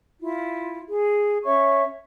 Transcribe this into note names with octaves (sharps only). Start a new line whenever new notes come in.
E4 F4
G#4
C#4 C#5 E5 C#6